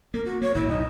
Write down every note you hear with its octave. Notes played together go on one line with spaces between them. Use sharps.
A#3 A#4
F#4
A#3 C#5
G#1 A2 C3 E4
B1 F#2 D#4